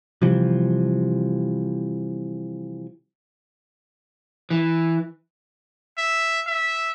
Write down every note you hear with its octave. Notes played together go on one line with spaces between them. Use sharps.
C3 E3 F3 G3
E3
E5
E5